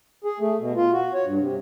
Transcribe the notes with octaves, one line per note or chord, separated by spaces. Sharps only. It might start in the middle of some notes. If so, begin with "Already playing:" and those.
G#4
A3
B2
F4
F#4
C#5
G2
C3